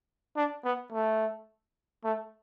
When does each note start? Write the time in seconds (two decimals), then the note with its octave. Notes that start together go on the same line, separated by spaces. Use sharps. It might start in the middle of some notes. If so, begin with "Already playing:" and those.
0.36 D4
0.64 B3
0.92 A3
2.04 A3